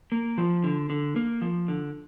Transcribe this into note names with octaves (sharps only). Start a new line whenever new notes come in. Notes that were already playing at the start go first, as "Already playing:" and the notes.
A#3
F3
D3
D3
A#3
F3
D3